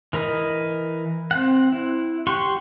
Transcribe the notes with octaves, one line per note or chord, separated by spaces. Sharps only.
E3 A#4 B4 D#5
C4 F#5
E4
G4 F#5 C6 C#6